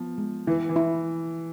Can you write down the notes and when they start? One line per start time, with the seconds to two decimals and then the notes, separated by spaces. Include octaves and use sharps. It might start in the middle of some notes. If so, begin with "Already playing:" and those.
Already playing: F3 B3
0.18 G#3
0.47 E3 E4
0.69 E3
0.76 E4